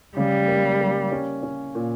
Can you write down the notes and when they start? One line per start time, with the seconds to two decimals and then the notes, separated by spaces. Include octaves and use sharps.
0.17 C#3 G3
0.48 A#3
0.80 A#3
1.12 C#4
1.43 C#4
1.75 A#2